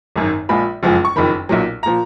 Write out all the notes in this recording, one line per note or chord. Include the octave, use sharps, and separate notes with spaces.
G#1 F#2 D#3
A#1 A#2 F3 G#3 B5
F#1 F2 F3 G#3
C#6
F#1 F2 D#3 B5
B1 A#2 F#3
A#2 F3 A#5